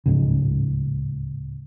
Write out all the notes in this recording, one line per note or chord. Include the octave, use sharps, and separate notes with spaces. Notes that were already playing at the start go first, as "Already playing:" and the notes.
D1 C#2 G#2 C#3